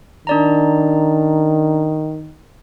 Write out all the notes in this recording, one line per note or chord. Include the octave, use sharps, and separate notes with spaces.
D#3 D4 D5 A#5